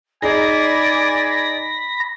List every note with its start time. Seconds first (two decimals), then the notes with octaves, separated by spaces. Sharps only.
0.22 D#4 G#4 D5 G#5 B5 A#6